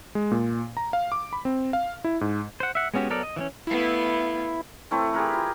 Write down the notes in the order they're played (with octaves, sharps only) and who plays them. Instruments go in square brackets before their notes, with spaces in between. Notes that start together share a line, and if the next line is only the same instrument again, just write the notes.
[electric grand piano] G#3
A#2
A#5
F5
D6
B5
C4
F5
E4
G#2
[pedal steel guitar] C5 F#5
E5 F#5
G#3 B3 C#4 F#4 G4
F#3 B3 A4 A#4 D5
D#5
E3 F#3 C#4
[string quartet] A3 B3 F5 [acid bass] E4
[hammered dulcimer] E3 A3 C4 E4
G4 G#4 A#4 B4
F4